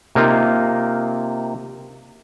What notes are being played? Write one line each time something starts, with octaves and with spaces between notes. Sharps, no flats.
C3 A#3 D#4 F4